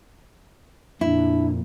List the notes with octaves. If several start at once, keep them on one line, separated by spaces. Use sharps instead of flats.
F2 A#2 D4 E4